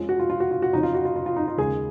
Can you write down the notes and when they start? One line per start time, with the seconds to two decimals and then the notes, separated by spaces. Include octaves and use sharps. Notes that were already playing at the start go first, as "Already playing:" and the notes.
Already playing: F2 F3 G#3 C#4
0.09 F#4
0.19 F4
0.30 F4
0.40 F#4
0.51 F4
0.62 F#4
0.73 F2 C#3 F#3 C#4 D#4
0.83 F4
0.95 F#4
1.05 F4
1.16 F4
1.26 F4
1.36 D#4
1.48 F4
1.58 D#2 C#3 G#3 G#4